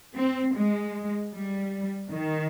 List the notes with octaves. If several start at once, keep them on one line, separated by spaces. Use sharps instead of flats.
C4
G#3
G3
D#3